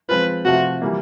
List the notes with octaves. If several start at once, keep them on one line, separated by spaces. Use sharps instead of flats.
F3 G#3 C4 F4 B4
C3 F3 A3 F#4
E3 G3 A#3